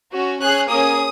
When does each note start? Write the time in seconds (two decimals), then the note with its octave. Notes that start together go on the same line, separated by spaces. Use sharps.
0.13 C#4 F#4
0.41 C#4 G#4 F#6
0.69 A#3 C#4 G#4 D#6